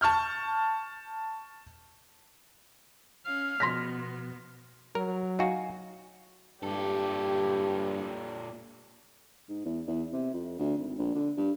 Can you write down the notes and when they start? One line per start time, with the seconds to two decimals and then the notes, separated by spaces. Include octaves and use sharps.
0.01 A5 C#6 F6 G6
3.26 C#4 F5
3.60 B2 F3 B3 C6 F6 A#6 B6
4.95 F#3 A#4
5.39 D#4 F#4 F5 G#5
6.63 G2 A#2 G4 A4
9.49 G#2
9.65 E2
9.88 E2
10.13 C3
10.33 F2
10.59 D2
10.78 G#1
10.98 A#1
11.15 D3
11.37 G2